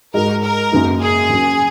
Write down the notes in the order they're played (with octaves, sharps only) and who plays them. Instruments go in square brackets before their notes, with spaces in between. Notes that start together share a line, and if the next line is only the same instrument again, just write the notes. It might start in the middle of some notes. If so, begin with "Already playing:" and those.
[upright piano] G#2 G#3 F#4 D#5 [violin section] A#4
[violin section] A#4
[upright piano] F#2 C#3 A#3 D#4
[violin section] G#4
[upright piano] C#3 F#3 C#4